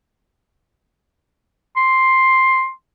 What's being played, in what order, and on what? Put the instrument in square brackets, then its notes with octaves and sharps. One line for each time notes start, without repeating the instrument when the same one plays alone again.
[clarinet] C6